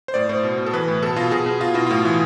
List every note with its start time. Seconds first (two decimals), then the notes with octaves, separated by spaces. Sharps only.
0.08 C5
0.14 A2 D5
0.29 A2 C5
0.43 B2
0.58 B2
0.66 A4
0.73 E3 B4
0.88 A2
1.02 B2 A4
1.16 B2 F4
1.31 B2 G#4
1.46 B2
1.60 B2 F4
1.74 B2 E4
1.87 A2 F4
2.05 E3